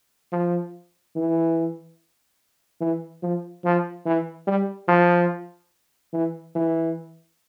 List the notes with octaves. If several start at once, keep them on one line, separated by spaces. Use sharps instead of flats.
F3
E3
E3
F3
F3
E3
G3
F3
E3
E3